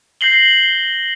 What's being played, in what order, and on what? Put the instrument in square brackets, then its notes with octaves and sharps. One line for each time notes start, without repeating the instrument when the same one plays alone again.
[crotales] G6 A#6 C7 F#7 G7